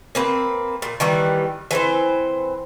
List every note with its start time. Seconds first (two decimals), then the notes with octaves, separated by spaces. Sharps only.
0.15 A#3 C4 B4
0.82 A#2
1.00 D#3 E3 G3
1.71 E3 C4 C5